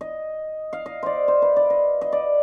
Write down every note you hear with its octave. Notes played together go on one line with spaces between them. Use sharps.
D#5
F5
D#5
C5 D5
C5
B4
D5
D#5
D#5
D5